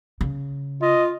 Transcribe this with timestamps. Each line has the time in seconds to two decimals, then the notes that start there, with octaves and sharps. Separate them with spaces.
0.21 C#3
0.82 F4 D#5